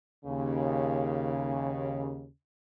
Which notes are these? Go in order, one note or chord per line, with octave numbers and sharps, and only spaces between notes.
D#2 C#3